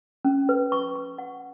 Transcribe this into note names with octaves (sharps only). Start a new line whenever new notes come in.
C#4
B4
C#6
C#6
F#5